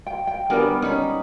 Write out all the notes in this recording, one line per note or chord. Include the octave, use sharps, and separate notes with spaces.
G5
G5
G3 B3 D4 A#4 G#5
C#4 D#4 B5